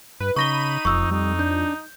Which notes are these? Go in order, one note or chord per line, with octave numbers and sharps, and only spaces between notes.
G2 B4
C#3 D#4 B5 C#6 A#6 D#7 G7
E1 F2 C#6 D#6 E6
G3 D#4
D4 G6